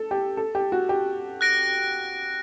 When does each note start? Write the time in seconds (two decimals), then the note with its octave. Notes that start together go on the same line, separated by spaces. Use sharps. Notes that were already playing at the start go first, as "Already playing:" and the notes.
Already playing: A4
0.11 G4
0.37 A4
0.55 G4
0.72 F#4
0.89 G4
1.41 F#6 A#6 D7